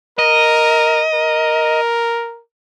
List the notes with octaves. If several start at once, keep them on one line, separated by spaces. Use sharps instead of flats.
A#4 D#5
A#4